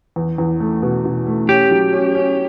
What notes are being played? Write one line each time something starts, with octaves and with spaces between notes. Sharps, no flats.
E2
E2
A3
B2
B2
A3
C#4 G4
F#3
C#4
C#4